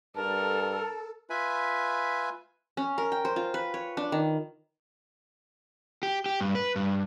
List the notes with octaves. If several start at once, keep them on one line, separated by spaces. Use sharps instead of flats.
G2 A4 A#4 A5
F4 B4 E5 G#5 B5
C#4
A#4
G5
C5
F4
B4
C#5
D4
D#3
G4
G4
G2
B4
G2